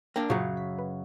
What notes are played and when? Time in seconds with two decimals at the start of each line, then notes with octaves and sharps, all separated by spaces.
0.16 A#3 D4 G5 E6 G6
0.30 F#2 A#2 C#3 F#3 F4 A#4
0.57 B6
0.79 B4